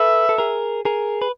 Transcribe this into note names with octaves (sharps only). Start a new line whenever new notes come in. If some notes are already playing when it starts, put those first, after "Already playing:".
Already playing: A4 B4 E5
A4
G#4 A#4
G#4 A#4
B4